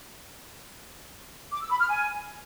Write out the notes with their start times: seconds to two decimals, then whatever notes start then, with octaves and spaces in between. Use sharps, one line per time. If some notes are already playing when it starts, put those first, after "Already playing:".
1.52 D6
1.62 E6
1.71 B5
1.80 F6
1.89 G#5